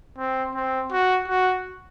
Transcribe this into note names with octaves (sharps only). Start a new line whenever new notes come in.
C4
C4
F#4
F#4